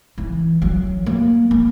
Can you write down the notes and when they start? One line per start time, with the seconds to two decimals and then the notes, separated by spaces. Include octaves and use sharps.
0.18 E3
0.62 F#3
1.06 A#3
1.51 A#3